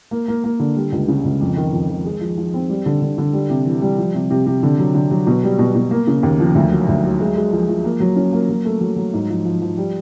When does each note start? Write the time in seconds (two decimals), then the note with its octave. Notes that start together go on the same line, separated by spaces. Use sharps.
0.11 A#3
0.28 A#3
0.44 A#3
0.60 D3
0.76 G3
0.92 C#2
1.08 C#3
1.24 C#2
1.41 F2
1.57 D#3
1.72 F2
1.89 D#3
2.05 G#3
2.21 F3
2.38 F3
2.54 C4
2.69 G3
2.86 D3
3.02 D3
3.18 D3
3.33 G3
3.50 C3
3.65 E3
3.82 G3
3.98 F3
4.14 C3
4.30 C3
4.46 C3
4.63 D3
4.79 F#3
4.94 D3
5.11 F#3
5.27 B2
5.43 G3
5.59 B2
5.75 B2
5.91 A#3
6.07 C#3
6.23 D#2
6.40 F3
6.55 D2
6.72 F#3
6.88 D2
7.04 F#3
7.20 G#3
7.36 G#3
7.52 F3
7.68 F3
7.84 A#3
8.00 F#3
8.16 C#4
8.33 A#3
8.49 F#3
8.65 A3
8.81 F#3
8.96 F#3
9.14 G#2
9.30 F3
9.45 F3
9.62 F3
9.77 G3